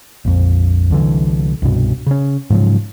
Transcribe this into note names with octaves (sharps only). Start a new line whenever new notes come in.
A#1 F2
C2 D3 E3
C2 G2 B2
C#3 C#4
G#2 C#3 F3 F#3